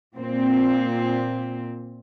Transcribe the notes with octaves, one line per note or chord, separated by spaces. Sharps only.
A#2 C4